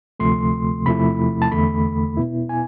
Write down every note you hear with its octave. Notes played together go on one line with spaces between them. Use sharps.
D2 C3 F3 A3 C6
E2 C3 F3 A3 E4 B5
A5
E2 D3 A3 B5
B2 B3 E4
G#5